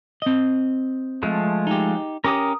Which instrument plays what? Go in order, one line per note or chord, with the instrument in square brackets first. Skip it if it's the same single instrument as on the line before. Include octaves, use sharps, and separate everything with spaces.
[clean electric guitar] C4 D#5
[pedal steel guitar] F3 G#3 A3
[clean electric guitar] D#4 G4
[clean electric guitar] C#4 G4 [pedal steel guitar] A#4 D6 D#6